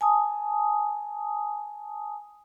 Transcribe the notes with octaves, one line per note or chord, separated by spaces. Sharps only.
G#5 A5 D#6